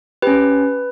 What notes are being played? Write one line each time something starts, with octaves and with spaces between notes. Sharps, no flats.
C#4 G4 B4